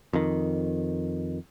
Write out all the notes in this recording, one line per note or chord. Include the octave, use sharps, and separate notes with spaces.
F2 D#3